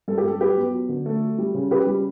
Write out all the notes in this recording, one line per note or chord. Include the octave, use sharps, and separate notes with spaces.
G2 A4
G4
G2 A4
F#3 G4 B4
B3
F#3
D3
A3 A4
F#3
G3
C#3
C#3 G4 B4
G3